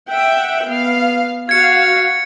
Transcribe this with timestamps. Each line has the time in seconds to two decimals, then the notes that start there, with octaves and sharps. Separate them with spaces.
0.10 E5 F#5 G5
0.68 B3 F5
1.49 F#4 F5 G#6 C#7